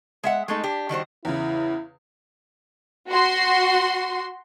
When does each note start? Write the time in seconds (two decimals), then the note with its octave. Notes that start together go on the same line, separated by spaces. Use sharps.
0.24 G#3 E5 F#5
0.48 G#3 A3 D#4
0.64 D4 G4
0.89 D#3 G3 F#4 C5
1.25 E2 C#3 E4
3.09 F#4 C6